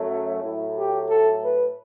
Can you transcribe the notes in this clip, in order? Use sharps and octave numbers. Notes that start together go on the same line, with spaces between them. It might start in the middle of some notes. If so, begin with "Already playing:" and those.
Already playing: F#2 F#3 A3
A2 F#3 A3 E4
G4
A4
B4